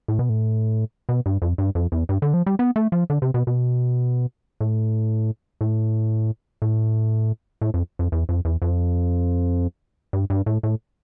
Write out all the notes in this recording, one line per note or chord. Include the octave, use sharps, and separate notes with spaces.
A2
B2
A2
B2
G2
F2
G2
F2
E2
G2
D3
F3
G3
B3
A3
F3
D3
C3
B2
B2
A2
A2
A2
A2
F2
F2
E2
F2
E2
F2
G2
G2
A2
A2